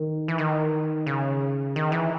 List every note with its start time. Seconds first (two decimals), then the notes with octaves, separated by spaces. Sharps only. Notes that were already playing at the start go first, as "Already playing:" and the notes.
Already playing: D#3
0.28 E3
0.38 D#3
1.06 C#3
1.76 D#3
1.92 E3